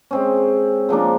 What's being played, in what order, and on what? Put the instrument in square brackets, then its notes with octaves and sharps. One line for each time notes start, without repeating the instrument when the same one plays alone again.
[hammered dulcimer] G#3 C4 C#4
C#3 F3 A#3 D4